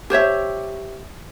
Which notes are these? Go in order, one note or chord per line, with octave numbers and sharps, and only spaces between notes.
G4 C5 C#5 E5